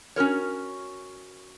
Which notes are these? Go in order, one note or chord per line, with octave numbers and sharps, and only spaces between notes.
C#4 F#4 A#4 C#5